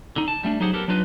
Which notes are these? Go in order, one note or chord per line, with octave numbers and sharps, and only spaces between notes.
D3 D#4
A5
G3 A3 C4 D4
F#3 D#4 G4 G#4 C5 F#5
B3 G4 A4 A#4
F#3 D4 D#4 F4 B4